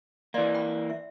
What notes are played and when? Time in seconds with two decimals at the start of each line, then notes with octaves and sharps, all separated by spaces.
0.34 E3 A#3 D5 D#5 C6
0.55 G5 B5
0.90 E5